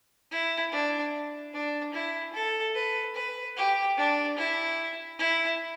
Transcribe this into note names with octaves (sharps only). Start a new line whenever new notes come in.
E4
D4
D4
E4
A4
B4
B4
G4
D4
E4
E4